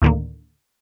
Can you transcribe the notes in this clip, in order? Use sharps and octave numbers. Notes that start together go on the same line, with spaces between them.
D2 A2 D3 D#3 A#3